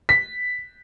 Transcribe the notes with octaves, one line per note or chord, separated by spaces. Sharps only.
B6